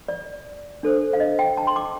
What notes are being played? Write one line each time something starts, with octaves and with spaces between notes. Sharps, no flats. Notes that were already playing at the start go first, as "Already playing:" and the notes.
D5
D4 A4 C5
F5
D#5
G5
A5
C6
D6